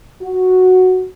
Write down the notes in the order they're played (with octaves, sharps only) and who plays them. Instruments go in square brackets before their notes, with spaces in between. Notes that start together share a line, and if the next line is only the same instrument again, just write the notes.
[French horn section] F#4